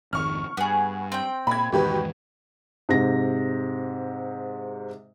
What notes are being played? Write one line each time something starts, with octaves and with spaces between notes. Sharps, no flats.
G#1 F2 D#3 C#6 F6
G2 B3 G#4
C4 G5
A#2 B5 G#6
E2 G#2 B2 D#3 G4 B4
G#2 C3 A#6